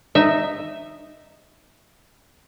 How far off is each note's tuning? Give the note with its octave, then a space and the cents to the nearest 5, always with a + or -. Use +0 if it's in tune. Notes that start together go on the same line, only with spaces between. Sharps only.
D#4 -10 E5 +0